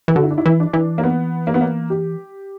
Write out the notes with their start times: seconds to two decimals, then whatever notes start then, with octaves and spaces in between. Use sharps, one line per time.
0.08 E3
0.16 D3 F#4
0.23 E4
0.31 D4
0.38 E4
0.46 E3
0.60 D4
0.73 E3
0.98 A#3
1.03 B3
1.47 A#3
1.54 B3
1.61 A#3
1.90 G4